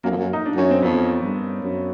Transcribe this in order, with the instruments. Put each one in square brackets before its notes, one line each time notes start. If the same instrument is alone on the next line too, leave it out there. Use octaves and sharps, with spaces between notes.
[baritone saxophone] F#2 [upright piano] A#3
[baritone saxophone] F2
F#2
[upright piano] D#4
D4
[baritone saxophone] F#2 [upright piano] C#4
[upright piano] C4
[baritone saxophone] F2 [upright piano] B3
[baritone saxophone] G2
F#2